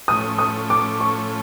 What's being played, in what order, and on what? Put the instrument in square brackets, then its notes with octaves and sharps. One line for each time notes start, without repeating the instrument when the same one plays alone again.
[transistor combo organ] A2 F3 A3 C#4 [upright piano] D#6
[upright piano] D#6
D6
C#6